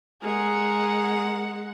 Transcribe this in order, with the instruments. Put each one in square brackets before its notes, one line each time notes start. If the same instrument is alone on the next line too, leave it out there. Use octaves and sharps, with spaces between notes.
[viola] G#3 F#5 [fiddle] G#4 A#4